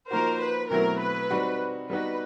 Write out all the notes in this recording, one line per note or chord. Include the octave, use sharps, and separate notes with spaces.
F3 A#3 D#4 F#4 A#4 C5
B4
B2 F#3 A3 C4 E4 A#4
B4
G3 C4 D#4 F#4
G3 B3 D#4 F#4 B4